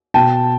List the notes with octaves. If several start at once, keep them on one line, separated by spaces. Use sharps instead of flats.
B2 G5 A5